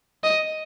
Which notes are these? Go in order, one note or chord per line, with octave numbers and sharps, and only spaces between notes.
D#5